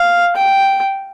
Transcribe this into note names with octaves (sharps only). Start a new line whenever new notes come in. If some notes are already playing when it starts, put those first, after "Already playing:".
Already playing: F5
G5